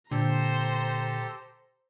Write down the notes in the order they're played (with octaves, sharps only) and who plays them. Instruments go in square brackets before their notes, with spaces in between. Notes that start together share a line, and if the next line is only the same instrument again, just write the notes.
[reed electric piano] A#2 [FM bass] D3 [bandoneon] G4 A4 [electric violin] C5 A#5